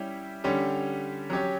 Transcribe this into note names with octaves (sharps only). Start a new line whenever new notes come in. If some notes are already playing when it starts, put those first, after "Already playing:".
Already playing: G3 C#4 E4 G4
D3 G3 C#4 G4
F#3 C#4 G4 C#5